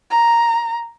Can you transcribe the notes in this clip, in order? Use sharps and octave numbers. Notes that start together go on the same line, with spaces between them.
A#5